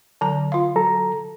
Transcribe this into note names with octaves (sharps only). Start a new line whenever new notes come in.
D3 F#3 A#5
F4 F5
F#3 A4 A#5